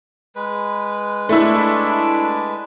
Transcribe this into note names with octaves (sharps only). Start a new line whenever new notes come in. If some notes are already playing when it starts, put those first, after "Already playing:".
G#3 B4
A3 D4 E4